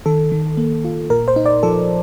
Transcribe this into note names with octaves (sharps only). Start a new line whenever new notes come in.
D#3 A4
D#3
A#3
F4
A#2 A#4
C5
D#4
D5
F3 A4